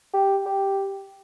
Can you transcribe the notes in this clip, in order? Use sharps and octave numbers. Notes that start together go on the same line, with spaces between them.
G4
G4